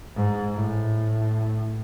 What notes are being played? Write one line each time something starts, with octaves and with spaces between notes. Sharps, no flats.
G#2
A2